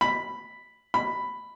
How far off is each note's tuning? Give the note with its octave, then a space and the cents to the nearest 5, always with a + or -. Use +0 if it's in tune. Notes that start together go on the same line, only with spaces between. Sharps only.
B5 +0
B5 +5